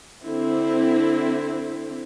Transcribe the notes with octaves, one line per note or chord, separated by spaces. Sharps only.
D3 C4 E4